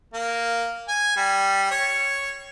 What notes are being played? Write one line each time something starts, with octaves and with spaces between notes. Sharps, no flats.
A#3
G#5
G3
C#5